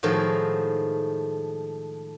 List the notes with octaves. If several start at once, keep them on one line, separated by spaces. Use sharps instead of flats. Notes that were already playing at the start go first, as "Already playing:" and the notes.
A2 D#3 F3 G#3 A3 F#4